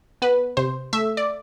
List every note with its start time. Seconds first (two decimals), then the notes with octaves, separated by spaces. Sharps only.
0.22 B3 B4
0.57 C3 C5
0.93 A3 E5
1.17 D5